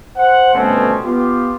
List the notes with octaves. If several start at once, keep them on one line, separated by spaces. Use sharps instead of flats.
C5 F#5
G1 B2 A3 C4 C#4 A5
B3 F4 G4